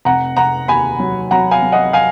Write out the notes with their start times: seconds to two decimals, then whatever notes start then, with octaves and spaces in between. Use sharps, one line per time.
0.05 F1 F#5 A#5
0.37 F1 F#5 A#5
0.68 D#2 G#5 B5
1.00 F#3
1.31 F#3 F#5 A#5
1.51 F5 G#5
1.62 F#3
1.72 D#5 F#5
1.93 F5 G#5